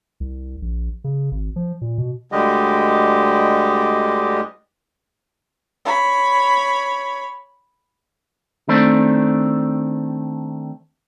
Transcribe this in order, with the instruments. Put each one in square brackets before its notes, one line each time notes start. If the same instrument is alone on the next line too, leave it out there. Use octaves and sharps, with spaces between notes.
[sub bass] C2
A#1
C#3
G#1
F3
A#2
B2
[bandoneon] D2 D3 G3 G#3 G4 D#5
[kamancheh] C#5 B5
[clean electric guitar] D#3 A3 C4 D4